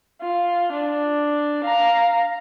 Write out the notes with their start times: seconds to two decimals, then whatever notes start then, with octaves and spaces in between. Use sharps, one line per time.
0.21 F4
0.72 D4
1.64 F5 A#5